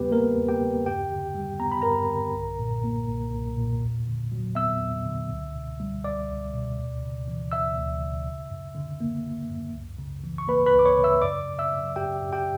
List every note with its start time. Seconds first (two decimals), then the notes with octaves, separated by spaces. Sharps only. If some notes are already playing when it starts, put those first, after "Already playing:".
Already playing: E2 C#3 G3 B3 G4 B4
0.11 A#3 A#4
0.37 E2
0.49 G4 G5
0.61 C#3
0.85 G2 G4 G5
1.11 D3
1.35 G3
1.59 B3 A#5
1.72 B5
1.82 G2 A#4 A#5
2.09 D3
2.34 B1
2.59 A#2
2.84 A#3
3.07 B1
3.32 B1
3.57 A#2
3.81 E2
4.07 D3
4.32 F#3
4.55 B3 E5 E6
4.80 E2
5.06 D3
5.30 C#2
5.54 B2
5.80 G3
6.04 C#2 D5 D6
6.29 C#2
6.54 B2
6.78 D2
7.03 C#3
7.28 E3
7.52 D2 E5 E6
7.77 D2
8.01 C#3
8.26 G1
8.50 F#2
8.75 D3
9.00 A#3
9.24 G1
9.49 F#2
9.74 C#2
9.98 C#3
10.24 E3
10.38 C#6
10.48 A#3 B4 B5
10.66 B4 B5
10.73 C#2
10.79 D6
10.85 C#5 C#6
10.97 C#3
11.04 E5 E6
11.22 F#2 D5 D6
11.47 C#3
11.59 E5 E6
11.72 F#3
11.96 F#2 G4 G5
12.21 F#2
12.33 G4 G5